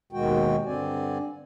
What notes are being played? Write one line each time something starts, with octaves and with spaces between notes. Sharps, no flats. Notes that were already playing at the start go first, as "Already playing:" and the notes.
D#2 B2 D#3 G#3 F#4 G5
G2 D3 C4 D5 G#5